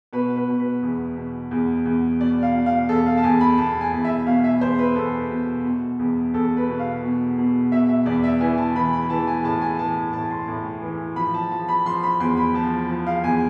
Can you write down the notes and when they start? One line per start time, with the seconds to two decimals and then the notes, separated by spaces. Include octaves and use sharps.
0.13 B2 B4
0.36 B4
0.48 B2
0.60 B4
0.83 E2
1.17 B2
1.51 E2
1.86 E2
2.20 B2 D5
2.43 F5
2.55 B2
2.66 F5
2.89 E2 A4
3.06 F5
3.17 A5
3.23 E2 G#5
3.41 B5
3.58 E2 A5
3.81 G#5
3.93 E2
4.04 E5
4.26 B2 F5
4.44 E5
4.61 E2 C5
4.79 B4
4.96 E2 A4
5.30 B2
5.64 B2
5.99 E2
6.34 E2 A4
6.57 B4
6.68 B2
6.79 F5
7.03 B2
7.38 B2
7.72 B2 E5
7.89 E5
8.06 E2 D5
8.23 E5
8.41 E3 G#5
8.57 A5
8.75 E3 B5
8.93 B5
9.10 E3 A5
9.27 G#5
9.44 A2 A5
9.61 G#5
9.79 E3 A5
9.97 A5
10.13 A2 A5
10.30 C6
10.48 A2
10.82 E3
11.16 F3 B5
11.34 A5
11.51 F3 A5
11.68 B5
11.85 F3 C6
12.03 B5
12.20 E2 C6
12.37 B5
12.54 F3 A5
12.89 F3
13.07 F5
13.23 E2 G#5